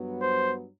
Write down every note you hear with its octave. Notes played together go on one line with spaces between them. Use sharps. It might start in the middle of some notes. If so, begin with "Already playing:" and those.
Already playing: G2 F#3 B3
C5